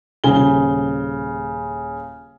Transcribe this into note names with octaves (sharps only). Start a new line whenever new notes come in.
D#1 C#3 G7